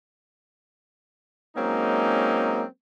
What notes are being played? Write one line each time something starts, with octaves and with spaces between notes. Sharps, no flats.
F#3 G#3 A#3 C4 C#4 D#4